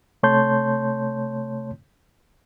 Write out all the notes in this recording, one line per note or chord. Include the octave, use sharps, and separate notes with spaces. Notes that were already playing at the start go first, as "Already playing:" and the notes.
C3 A3 C#5 A5 C6 G6